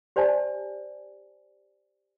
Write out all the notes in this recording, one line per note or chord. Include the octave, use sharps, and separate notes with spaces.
G4 C5 D5 G#5 A5